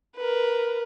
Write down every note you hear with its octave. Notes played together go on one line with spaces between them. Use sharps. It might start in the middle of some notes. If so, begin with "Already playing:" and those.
A#4 B4